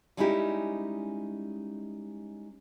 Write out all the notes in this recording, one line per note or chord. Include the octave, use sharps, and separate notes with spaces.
G3 G#3 C#4 D#4 E4 G4